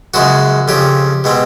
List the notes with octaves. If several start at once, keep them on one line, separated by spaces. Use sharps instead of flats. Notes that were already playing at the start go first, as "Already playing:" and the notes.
F#2 C#3 F3 G#3 F#4
F2 C#3 F3 G4
B2 G#3 C4